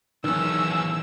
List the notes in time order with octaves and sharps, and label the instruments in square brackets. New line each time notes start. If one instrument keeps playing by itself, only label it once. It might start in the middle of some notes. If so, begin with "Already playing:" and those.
[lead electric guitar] B1 C#4 [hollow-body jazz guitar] E2 D#3 [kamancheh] E6